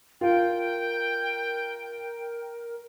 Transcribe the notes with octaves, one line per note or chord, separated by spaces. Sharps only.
F4 A#4 G5